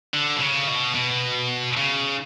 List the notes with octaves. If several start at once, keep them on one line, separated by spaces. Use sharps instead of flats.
D3
B2
C#3
B2
B2
C#3